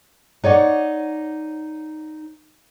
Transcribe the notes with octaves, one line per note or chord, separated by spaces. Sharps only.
D#4 C#5 D5 F#5